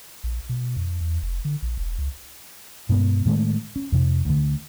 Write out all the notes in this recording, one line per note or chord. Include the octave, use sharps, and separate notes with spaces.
A#1
B2
F2
E2
F1
D3
A#1
E1
C#2
G2 B2 G#3 B3
A2 D#3 G#3 A3
C#4
F2 C3
D2 D3